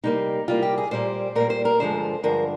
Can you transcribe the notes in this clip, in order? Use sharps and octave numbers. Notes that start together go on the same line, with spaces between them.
C3 G3 A#3 D#4
C3 G3 A#3 F4
G4
G#4
A#2 G3 A#3 C5
A#2 G3 A#3 A#4
C5
A#4
G2 D3 F3 G#3 C5
G2 D3 F3 G#3 A#4